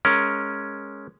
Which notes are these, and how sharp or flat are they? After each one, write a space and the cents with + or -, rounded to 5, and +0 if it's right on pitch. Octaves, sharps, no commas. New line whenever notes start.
G#3 +0 C#4 +0 A#4 +0